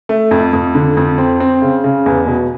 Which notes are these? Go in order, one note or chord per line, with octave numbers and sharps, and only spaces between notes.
A3
F2
F2
D3
F2
C4
C4
C#3
C#3
E2
B2